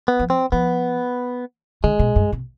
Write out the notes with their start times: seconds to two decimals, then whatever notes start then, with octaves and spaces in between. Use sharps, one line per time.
0.08 B3
0.20 F3
0.30 C4
0.52 F3 B3
1.84 D3 G#3
1.99 B2
2.16 G2
2.33 C3